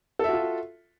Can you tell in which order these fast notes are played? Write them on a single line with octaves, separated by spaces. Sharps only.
A4 E5 F#4 F4